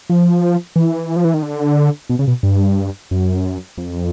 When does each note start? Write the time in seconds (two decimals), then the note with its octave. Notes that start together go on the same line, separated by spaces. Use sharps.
0.10 F3
0.76 E3
1.16 F3
1.25 E3
1.34 D#3
1.43 D3
2.10 B2
2.19 C#3
2.27 B2
2.43 G2
3.11 F#2
3.78 F2